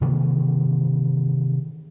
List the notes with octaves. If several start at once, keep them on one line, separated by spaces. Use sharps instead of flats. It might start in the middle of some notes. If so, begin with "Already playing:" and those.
C3 D#3 E3 A#3